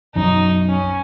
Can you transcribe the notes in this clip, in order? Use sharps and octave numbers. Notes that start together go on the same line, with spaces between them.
B1 F#2 F#3 D#4
C#4